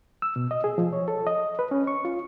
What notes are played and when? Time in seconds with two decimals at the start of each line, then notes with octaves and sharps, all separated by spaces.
0.22 E6
0.36 B2
0.51 D#5
0.64 G#4
0.78 F3
0.93 C#5
1.08 A4
1.27 D#5
1.59 B4
1.71 C#4
1.87 C#6
2.05 F4